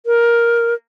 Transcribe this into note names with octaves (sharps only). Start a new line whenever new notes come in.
A#4